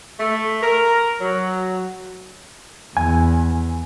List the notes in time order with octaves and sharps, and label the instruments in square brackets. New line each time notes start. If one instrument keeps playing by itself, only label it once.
[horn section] A3
A#4
F#3
[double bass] E2 [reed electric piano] G#5